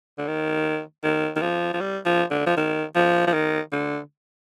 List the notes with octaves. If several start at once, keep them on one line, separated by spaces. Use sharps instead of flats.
D3
D#3
D#3
D#3
F3
F3
G3
F3
D3
F3
D#3
F3
F3
D#3
D3